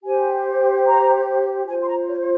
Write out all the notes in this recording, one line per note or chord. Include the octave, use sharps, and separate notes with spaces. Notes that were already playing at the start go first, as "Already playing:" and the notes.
G4 C5 G#5
A#5
F4 C5 G#5
C6
A#5
C#5